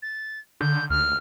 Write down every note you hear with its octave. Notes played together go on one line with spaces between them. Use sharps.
A6
D3 G6
D2 F6